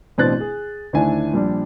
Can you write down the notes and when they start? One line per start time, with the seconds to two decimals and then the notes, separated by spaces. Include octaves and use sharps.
0.18 A1 B2 C4 D4 F#6 A6
0.40 G#4
0.93 D2 D#3 D4 E4 G#5
1.33 A#1 G3 D4